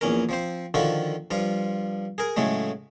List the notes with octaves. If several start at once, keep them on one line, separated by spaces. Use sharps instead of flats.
A#1 E2 C#4 A#4
F3 C4 C5
D3 D#3 F3 F4 F#4 A4
G2 F3 F4
G#4 A#4
A2 C#3 F#3 G#3 A3